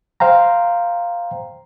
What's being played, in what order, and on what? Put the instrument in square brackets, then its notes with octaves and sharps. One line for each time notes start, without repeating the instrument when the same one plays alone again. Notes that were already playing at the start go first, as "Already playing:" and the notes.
[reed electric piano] C5 F5 G5 A#5